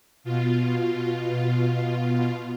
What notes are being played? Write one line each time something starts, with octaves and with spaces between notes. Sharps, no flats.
B2 F4